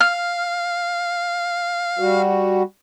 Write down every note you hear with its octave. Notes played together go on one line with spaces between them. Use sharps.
F5 F6
G3 F#4